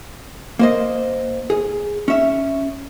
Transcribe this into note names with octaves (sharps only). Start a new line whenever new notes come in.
A#3 C5 D#5
G#4
C#4 E5